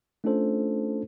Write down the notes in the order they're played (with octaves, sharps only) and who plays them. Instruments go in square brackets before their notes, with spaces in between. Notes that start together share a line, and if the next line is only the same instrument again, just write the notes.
[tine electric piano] A3 C#4 D4 F4 A4 C5